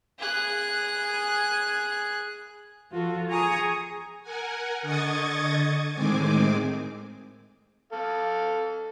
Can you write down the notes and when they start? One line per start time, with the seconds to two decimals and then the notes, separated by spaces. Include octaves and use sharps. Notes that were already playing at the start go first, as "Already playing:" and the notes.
0.19 G#4 F#6
2.91 F3 F4 F#4 A4
3.28 G#4 G#5 A#5 C#6 D#6
4.22 A#4 F#5 G#5
4.82 D3 D#5 C#6 D#6 G#6 A6
5.94 A2 D#3 G#3 C4 G#5 D6
7.92 A4 F5